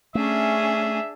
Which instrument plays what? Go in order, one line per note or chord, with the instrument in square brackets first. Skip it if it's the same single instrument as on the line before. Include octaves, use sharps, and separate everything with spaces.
[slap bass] A3 [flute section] C#4 [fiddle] D4 G#4 [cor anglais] E5